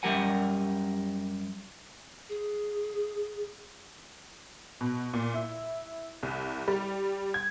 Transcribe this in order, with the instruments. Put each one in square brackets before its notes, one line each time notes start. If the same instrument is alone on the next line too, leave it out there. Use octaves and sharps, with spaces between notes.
[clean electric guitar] F#2 G3 G4 A#4 F#5 G#5
[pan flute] G#4
[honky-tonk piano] B2
A#2
E4
C2
G3
G#6